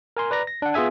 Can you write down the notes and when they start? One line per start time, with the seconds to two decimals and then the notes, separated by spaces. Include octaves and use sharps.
0.17 A#4 G#5 C6
0.31 B4 D5 A#5 A#6
0.47 A#6
0.62 D4 F#5
0.74 B3 F4 G#4 E5 G#5